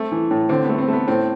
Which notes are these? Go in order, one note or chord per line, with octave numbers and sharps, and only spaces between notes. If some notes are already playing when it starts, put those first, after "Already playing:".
Already playing: A3 C4
E3
A2
D3 C4
B3
A3
C4
A3
B3
A2 C4